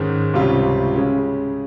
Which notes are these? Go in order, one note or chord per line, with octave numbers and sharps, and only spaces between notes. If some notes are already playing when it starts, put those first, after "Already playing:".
Already playing: G#2 D#3 G#3 C#4
C#2 C3 G3 C#4 F4
C#3 G#3 C#4